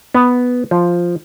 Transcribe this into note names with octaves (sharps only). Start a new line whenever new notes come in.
B3
F3